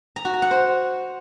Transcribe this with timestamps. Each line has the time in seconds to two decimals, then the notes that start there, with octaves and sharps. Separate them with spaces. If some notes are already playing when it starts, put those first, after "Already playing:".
0.16 A#5
0.25 F#4
0.33 A#5
0.42 F#5
0.51 C5